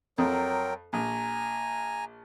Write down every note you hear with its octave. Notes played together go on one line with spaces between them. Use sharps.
F2 F#3 A#4 G5
A#1 G#5 A#5